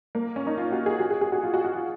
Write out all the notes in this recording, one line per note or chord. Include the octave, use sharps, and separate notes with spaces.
A#3
C#4
D#4
F4
F#4
G#4
F#4
G#4
G#4
F#4
F4
F#4
F#4
F4